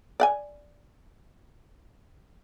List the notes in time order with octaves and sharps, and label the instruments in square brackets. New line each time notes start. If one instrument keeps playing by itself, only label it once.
[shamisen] D5 F#5 G#5